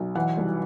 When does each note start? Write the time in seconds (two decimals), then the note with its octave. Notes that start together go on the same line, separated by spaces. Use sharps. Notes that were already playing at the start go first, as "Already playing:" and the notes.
Already playing: B1
0.15 E3 F#5
0.37 C2